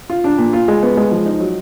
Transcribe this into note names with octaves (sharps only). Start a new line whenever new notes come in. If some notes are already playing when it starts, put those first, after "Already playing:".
F4
D4
A#2
F4
G#3
B3
G#3
F3
D#4
F#3